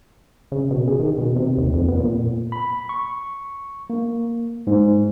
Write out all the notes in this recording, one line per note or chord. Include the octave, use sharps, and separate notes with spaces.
C#3
B2
G#4
D#3
B2
C3
D#2
F2
B3
A#2
B5
C#6
A#3
G#2